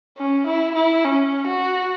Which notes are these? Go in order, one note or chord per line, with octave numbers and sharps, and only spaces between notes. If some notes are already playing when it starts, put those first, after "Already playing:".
C#4
E4
E4
C#4
F#4